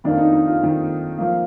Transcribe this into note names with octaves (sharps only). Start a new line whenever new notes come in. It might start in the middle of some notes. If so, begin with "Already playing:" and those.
F2 D#3 A#3 D4
D#4
D#4
F4
F2 D#3 A#3
F3 A#3